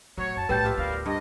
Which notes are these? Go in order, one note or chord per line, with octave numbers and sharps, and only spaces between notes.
A2 F#3 C#5
F#2 A5
B1 A2 G3 B4 G5 A5 G6
F4 G4 E5
D2 G3 B3 A#4 F5
G2 D#5